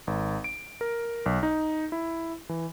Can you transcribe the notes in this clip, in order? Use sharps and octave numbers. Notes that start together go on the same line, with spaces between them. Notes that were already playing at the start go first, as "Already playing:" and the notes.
G#1
D7
A#4
B1
D#4
E4
E3